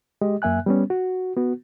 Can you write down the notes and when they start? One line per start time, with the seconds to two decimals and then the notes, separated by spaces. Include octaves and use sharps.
0.21 G#3 G4 D#5
0.42 F#2 A#3 E5 G#5 F#6
0.66 G3 B3 C#4
0.90 F#4
1.37 B3 F#4